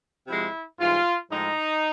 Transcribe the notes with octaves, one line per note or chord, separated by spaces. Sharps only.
C3 F3 G#3 E4
G#2 E3 G3 F4
A2 F3 G#3 D#4